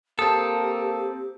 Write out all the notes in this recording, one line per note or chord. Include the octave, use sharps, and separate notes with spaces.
A#3 C4 G4 A4 A5 D#6